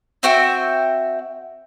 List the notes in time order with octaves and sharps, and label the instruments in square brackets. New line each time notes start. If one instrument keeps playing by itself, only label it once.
[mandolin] C4 F#4 E5 G5